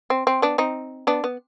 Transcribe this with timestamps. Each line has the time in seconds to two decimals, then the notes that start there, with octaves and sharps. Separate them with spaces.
0.10 C4
0.27 C4
0.42 B3 D4
0.58 C4 D#4
1.07 B3 D4
1.24 B3